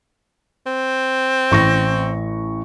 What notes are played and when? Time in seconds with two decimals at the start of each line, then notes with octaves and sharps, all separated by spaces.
0.66 C4
1.51 A1 C#6 A#6